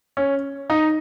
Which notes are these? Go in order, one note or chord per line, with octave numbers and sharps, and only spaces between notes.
C#4
D#4